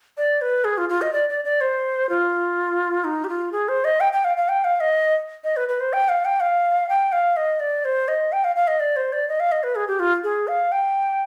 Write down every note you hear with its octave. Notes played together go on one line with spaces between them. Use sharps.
D5
B4
G#4
F4
F4
D#5
D5
D5
D5
C5
F4
D#4
G4
F4
G#4
C5
D#5
G5
G5
F5
F5
G5
F5
D#5
D#5
B4
B4
C5
G5
F5
G5
F5
G5
F5
D#5
D5
C5
D#5
G5
F5
F5
D#5
D5
C5
D5
D#5
F5
D#5
B4
G#4
G4
F4
G#4
F5
G5